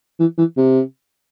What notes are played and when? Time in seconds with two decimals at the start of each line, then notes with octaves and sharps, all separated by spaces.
0.20 E3
0.38 E3
0.57 C3